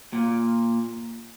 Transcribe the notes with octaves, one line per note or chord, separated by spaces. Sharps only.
A#2